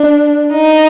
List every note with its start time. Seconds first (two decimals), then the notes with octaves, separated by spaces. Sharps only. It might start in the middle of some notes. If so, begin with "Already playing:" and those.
Already playing: D4
0.52 D#4